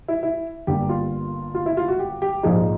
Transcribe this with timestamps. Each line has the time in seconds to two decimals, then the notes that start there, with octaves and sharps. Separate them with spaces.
0.08 E4
0.23 E4
0.67 G1 G2 D3 G3 A#3 G4
0.89 F4
1.55 F4
1.66 E4
1.77 F4
1.88 F#4
1.99 G4
2.22 G4
2.43 A#1 G#2 F3 A#3 D#4 G#4